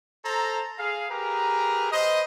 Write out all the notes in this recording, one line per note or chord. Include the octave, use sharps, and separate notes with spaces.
A4 C5 A#5
G#4 F5
G4 G#4 A#4 B4 A#5
B4 C5 D#5